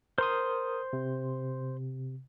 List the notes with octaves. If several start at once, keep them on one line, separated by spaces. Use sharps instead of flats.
A#4 C5 C6 D#6
C3